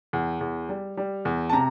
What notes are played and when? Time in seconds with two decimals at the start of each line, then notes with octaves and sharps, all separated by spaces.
0.13 E2
0.41 E2
0.69 G3
0.97 G3
1.25 E2
1.50 A5
1.53 C3 A#5